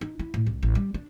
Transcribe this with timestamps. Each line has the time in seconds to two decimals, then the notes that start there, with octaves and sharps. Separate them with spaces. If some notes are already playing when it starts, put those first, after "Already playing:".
0.01 D#4
0.19 E4
0.34 A2
0.47 C2
0.63 A1
0.75 G3
0.94 D4